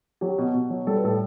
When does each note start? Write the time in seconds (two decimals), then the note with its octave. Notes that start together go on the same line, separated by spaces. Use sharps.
0.21 F#3 G4
0.38 B2
0.54 B2
0.70 F#3
0.87 G3 A4
0.95 B4
1.04 A2 A4